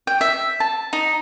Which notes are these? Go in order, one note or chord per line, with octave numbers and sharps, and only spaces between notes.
G5
E5
A5
D#4